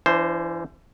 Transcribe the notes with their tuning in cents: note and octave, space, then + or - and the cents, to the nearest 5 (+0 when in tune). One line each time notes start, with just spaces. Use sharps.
E3 +30 D4 -10 C5 +0